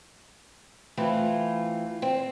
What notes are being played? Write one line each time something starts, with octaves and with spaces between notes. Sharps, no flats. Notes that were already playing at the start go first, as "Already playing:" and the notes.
E3 A3 C4 F4
C4